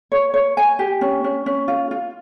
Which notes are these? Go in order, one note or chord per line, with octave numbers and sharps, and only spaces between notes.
C#5
C#5
G#5
G4
C#4
C#4
C#4
F4
F4